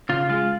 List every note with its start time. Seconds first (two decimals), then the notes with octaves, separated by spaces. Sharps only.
0.09 C#3 F4
0.30 G#3 F4